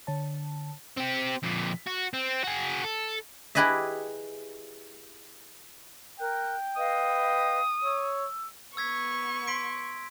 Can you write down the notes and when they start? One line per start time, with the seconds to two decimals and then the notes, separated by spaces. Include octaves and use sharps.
0.07 D3 C#5 A5
0.97 C4 G4
1.43 F2 A#2
1.87 F#4
2.14 C4
2.44 F#4 G#4
2.84 A4
3.55 E4 G4 G#4 B4 D#5 E5
6.20 A#4 G5 F#6
6.76 B4 D#5 F5 D#6
7.84 C#5 E6
8.77 B3 C#6 E6 G#6 B6
9.48 C6 B6 D7